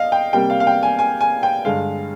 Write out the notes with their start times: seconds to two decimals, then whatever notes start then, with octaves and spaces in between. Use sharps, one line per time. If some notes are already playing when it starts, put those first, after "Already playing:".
Already playing: D#5 F5
0.12 G5
0.33 C3 G3 A#3 G5
0.50 F5
0.60 F5
0.67 G5
0.83 G#5
0.99 G#5
1.21 G#5
1.43 G5
1.65 G2 D3 G#3 F5